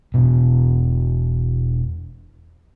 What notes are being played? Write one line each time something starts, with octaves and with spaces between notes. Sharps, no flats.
E1 B2